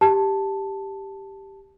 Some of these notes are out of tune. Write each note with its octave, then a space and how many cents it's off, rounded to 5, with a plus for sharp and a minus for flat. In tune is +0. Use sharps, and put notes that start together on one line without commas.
G4 +0 A5 +0